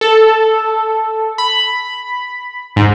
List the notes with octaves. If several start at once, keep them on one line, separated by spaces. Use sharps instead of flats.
A4
B5
G#2